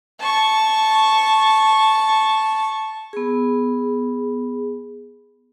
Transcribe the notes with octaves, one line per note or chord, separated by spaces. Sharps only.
A5 C#6
B3 G#4